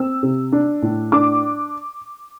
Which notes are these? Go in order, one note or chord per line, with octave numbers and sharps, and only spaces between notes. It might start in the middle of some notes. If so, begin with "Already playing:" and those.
Already playing: C4 E6
C3
D4
A2
D4 D6